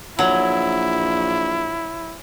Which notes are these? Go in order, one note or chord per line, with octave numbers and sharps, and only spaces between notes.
A#1 F#3 E4